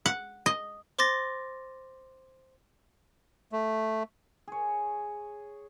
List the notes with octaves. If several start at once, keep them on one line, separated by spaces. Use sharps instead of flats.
F#5
D#5
C5 C6 D6 A6 A#6
A3
G#4 C#5